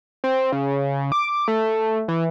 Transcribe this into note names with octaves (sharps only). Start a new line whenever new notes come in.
C4
C#3
D6
A3
E3